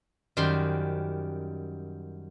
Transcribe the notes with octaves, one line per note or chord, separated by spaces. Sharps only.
F#2 D#3 G3 G4 C5 C6